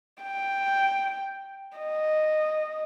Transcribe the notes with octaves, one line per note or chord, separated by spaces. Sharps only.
G5
D#5